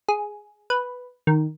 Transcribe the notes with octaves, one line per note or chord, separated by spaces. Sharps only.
G#4
B4
D#3